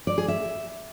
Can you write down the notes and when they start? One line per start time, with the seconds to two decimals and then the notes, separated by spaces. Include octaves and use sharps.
0.07 D5
0.18 G#4
0.28 E5